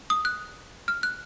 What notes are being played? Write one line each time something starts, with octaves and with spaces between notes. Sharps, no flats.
D#6
F#6
F6
F#6